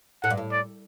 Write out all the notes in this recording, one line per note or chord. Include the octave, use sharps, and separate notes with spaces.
A2 F#5
G2
A2
D5